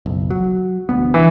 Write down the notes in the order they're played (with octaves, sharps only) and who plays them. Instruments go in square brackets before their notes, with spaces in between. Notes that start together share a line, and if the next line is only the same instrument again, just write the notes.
[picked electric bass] F#1 B1
F#3
E1 D2 B3
[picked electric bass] C2 D4 [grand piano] E3